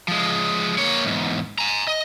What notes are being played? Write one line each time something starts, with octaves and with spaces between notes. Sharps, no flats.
F3 G#3
A#3 C#5
E2 G#2
G#5 A#5
D#5